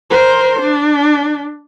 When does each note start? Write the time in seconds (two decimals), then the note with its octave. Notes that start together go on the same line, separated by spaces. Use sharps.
0.10 A#4 C5
0.61 D4